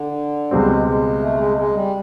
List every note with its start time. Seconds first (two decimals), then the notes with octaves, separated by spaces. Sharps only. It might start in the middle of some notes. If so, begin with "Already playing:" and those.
Already playing: D3
0.51 C#2 B2 G3 G#3 C4
0.86 G#3
1.21 A3
1.38 G#3
1.56 G#3
1.73 G3